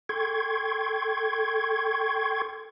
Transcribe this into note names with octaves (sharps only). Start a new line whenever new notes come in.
A4 G5 C6 C#6 G#6